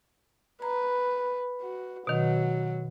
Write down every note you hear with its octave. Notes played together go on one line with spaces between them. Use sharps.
B4 A#5
F#4
B2 D#3 F#3